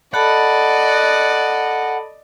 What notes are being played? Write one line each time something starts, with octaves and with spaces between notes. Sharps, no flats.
A4 D5 D#5 F#5 A5 B5